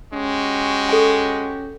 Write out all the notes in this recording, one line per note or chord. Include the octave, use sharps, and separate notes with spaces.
G#3 C#4 F#4 G4 C#6
A4 G#5